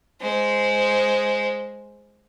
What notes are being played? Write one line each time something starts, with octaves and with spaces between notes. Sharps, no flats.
G#3 C5